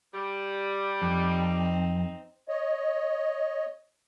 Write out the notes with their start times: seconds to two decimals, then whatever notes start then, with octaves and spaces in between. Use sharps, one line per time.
0.14 G3
1.02 F2 C4 D#4
2.48 C#5 D#5